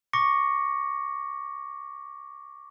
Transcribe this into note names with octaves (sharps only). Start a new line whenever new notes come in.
C#6 D6 A#6 C#7